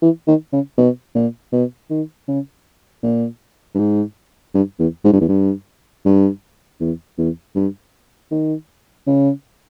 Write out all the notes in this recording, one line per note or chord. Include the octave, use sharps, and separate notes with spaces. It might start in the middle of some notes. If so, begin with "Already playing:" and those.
E3
D#3
C#3
B2
A#2
B2
D#3
C#3
A#2
G2
G#2
G2
E2
G#2
G2
E2
G2
G2
E2
E2
G2
D#3
C#3